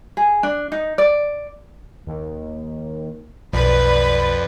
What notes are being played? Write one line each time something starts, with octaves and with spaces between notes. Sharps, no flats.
G#4
D4
D#4
D5
D#2
B1 F2 B4 D5